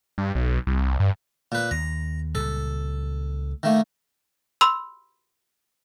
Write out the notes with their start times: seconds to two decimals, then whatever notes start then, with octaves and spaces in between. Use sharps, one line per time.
0.18 G2
0.35 B1
0.67 C2
1.00 G2
1.52 A#2 B4
1.71 D#2 A#5
2.35 C#2 A#2 G3 A4
3.63 D#3 A3 A#3
4.61 B5 C6 E6